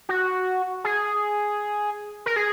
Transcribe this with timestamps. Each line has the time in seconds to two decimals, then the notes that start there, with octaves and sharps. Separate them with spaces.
0.09 F#4
0.84 G#4
2.26 A#4
2.36 G#4